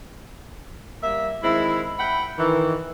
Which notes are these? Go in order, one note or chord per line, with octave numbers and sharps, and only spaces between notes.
G3 A#3 E5
D#3 G#3 C4 E4
E5 F#5 G5 B5
D#3 E3